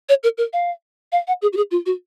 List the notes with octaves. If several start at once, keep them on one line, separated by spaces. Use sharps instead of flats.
C#5
A#4
A#4
F5
F5
F#5
G#4
F#4
G#4
F4
F#4